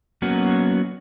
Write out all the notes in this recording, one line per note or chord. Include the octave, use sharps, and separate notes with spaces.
F#3 A#3 B3 C#4 F#4